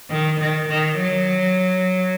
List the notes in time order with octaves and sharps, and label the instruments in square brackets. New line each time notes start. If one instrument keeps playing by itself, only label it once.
[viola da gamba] D#3
D#3
D#3
F#3